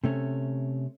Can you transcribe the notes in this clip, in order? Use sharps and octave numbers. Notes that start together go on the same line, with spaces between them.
C3 A3 C#4